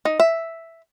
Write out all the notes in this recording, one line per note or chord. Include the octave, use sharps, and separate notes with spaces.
D#4
E5